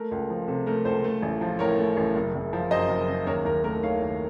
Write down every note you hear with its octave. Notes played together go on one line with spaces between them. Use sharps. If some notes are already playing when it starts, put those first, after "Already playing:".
Already playing: A3 A#4
C#2
F3
C3 A4
A3 A#4
C#2 A4 C5
A3
A1
F3
A2 A#4 C#5
A3
A1
F#1
F#1
F3
F#2 C5 D#5
F#1
F#1
D#2 A#4 C#5
D#2 A#4
A3 A#4
D#3 C#5 F5
D#2